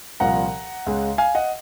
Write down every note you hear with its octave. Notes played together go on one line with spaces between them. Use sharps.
C2 A#2 F3 F#5 A#5
C#2 C#3 G#3
F5 G#5
D#5 F#5